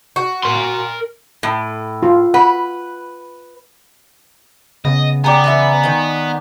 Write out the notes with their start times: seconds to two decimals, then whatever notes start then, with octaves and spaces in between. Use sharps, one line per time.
0.16 F#4
0.43 A#4 C6
1.43 A2
2.03 F4
2.34 B4 F#5
4.85 C#3 B3 D#5
5.24 B3 G4 G#4 D5 G#5 A#5
5.44 E3 B4 E5
5.83 D#3 G5